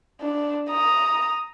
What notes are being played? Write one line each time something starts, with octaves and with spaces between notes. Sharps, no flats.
D4
A#5 D#6